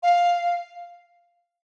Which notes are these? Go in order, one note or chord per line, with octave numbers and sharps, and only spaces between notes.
F5